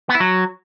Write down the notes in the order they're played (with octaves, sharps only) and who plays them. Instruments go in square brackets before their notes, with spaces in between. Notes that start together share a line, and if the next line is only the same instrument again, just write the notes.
[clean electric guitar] B3
E4
F#3